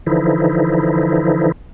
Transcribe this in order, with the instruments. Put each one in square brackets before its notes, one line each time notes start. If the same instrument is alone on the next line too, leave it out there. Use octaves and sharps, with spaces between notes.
[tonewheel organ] D3 E3 F3 D#4 E4